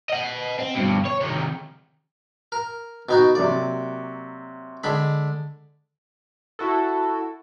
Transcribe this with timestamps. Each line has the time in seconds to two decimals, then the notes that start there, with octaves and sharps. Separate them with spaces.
0.09 D#5 F#5
0.59 C4
0.75 G2 B2
1.05 C#5
1.21 C3 D#3
2.52 A#4
3.09 B2 D#4 F#4
3.35 C3 F#3 A#3 D5
4.84 D3 G#3 B5
6.59 E4 F#4 A4